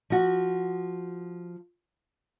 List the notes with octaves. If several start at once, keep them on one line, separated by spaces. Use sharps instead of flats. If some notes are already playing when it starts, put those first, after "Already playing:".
F3 F#4